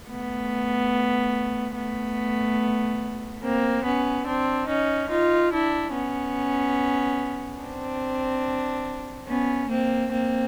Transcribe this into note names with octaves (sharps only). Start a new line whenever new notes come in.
A3 B3
A3 B3
A#3 C4
B3 C#4
C4 D4
C#4 D#4
D#4 F4
D4 E4
B3 C#4
C4 D4
B3 C#4
A#3 C4
A#3 C4